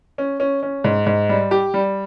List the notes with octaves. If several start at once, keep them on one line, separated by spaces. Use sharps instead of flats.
C#4
C#4
C#4
G#2
G#2
G3
G4
G3